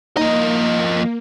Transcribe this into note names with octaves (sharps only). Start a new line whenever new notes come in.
F3 A#3 D#4 D#5